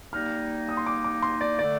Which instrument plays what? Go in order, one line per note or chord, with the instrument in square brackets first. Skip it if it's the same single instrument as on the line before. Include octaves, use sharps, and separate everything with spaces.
[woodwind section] G3 A#3 D#4 [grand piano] F6
[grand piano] D#6
C6
D6
D6
C6
D5
[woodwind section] D3 A3 [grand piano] D5